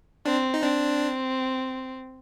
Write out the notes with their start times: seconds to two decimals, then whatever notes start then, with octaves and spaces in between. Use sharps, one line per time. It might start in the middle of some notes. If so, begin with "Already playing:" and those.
0.26 C4 D4
0.54 D#4
0.63 C4 D4